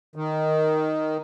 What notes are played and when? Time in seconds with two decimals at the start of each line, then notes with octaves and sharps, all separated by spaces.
0.16 D#3